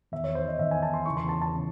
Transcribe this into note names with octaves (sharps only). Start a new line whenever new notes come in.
E2 D#3 E5
C#5
C5
D#5
E2 D#3 E5
G#5
A5
C6
E2 C#3 E3 C#6
C6
A5
A5
C#3 E3